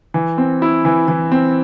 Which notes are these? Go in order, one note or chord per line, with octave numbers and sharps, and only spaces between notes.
E3
C4
E4
E3
E3
C4